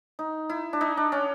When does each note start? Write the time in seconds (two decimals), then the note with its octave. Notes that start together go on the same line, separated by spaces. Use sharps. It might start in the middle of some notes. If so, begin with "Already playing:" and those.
0.19 D#4
0.50 E4
0.73 D4
0.81 D#4
0.97 D4
1.12 C#4